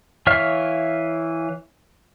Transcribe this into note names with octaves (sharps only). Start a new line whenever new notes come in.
E3 C#5 E5 F5 F6